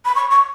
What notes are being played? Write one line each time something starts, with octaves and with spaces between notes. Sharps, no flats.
B5
C#6
C#6